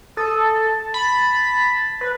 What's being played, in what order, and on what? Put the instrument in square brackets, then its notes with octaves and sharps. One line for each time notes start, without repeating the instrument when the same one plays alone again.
[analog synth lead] A4 [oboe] D#6
[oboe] A5
[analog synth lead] B5
B4